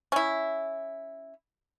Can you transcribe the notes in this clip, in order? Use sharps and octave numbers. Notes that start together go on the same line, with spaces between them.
C#4 E4